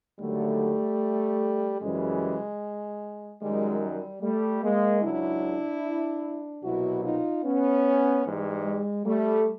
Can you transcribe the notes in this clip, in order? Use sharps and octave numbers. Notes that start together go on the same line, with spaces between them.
D#2 D3 F#3 G3 A3
F#2 C#3 E3 G3 G#3
F#2 D#3 G3 G#3
G3
G3 A3
G#3 A#3
C#2 C#3 F#3 D4 E4
C2 B2 F#3 E4 F#4
D#4 F4
B3 C#4
G#2 E3 G3
G#3
G3 A3